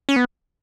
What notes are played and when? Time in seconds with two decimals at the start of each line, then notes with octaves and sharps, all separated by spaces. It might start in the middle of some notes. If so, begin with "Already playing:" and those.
0.09 C#4
0.16 B3